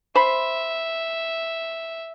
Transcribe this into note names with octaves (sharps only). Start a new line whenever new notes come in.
C5 E5 B5